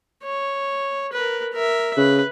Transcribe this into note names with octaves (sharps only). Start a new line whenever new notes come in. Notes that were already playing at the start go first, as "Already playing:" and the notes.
C#5
A#4 B4
A#4 E5
C#3 B4